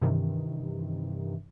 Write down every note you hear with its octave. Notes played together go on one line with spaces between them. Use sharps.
G2 C3 D#3 E3